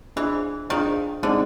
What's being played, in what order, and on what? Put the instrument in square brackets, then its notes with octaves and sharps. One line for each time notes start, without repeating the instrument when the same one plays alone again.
[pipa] E3 [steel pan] D4 F4 G#4 C5 D#5
[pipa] D#3 [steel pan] D4 F4 G#4 C5 D#5
[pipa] D3 [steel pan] G#3 C4 D#4 G#4 C5